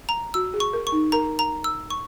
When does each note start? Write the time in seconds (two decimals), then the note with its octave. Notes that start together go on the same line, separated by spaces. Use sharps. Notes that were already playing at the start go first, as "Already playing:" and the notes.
0.09 A#5
0.34 F#4 E6
0.54 G#4
0.60 C#6
0.73 A#4
0.87 C#6
0.92 D#4
1.12 A#4 A#5
1.39 A#5
1.64 E6
1.90 C#6